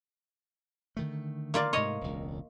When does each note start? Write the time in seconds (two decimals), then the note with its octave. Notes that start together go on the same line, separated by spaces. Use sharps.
0.97 D3 D#3 A3
1.54 A#3 F4 D5
1.73 G#2 C3 A3 C#5 D#5
2.01 E1 C#2